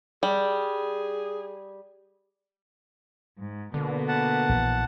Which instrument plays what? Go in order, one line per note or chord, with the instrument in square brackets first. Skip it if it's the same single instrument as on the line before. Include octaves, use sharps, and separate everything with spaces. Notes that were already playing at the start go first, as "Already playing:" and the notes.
[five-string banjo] G3 [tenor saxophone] G#4
[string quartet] G#2
[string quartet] B2 A#3 B3 [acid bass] D3
[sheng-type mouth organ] F#5 A5
[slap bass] A#1 E3